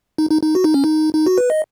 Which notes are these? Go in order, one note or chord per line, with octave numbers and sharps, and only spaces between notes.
D#4
D#4
D#4
F#4
D#4
C#4
D#4
D#4
F#4
B4
D#5